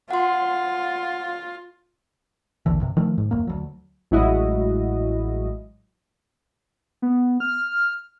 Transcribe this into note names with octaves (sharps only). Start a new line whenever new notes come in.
F4 F#5 C6
A#1 D#2 D3 E3
C2 G2 C3
D#3 F3 A3
G#2
E1 C2 F#2 A#3
D2 F#3
A1 F#3 G#3 E4 F#4 D#5
B3
F6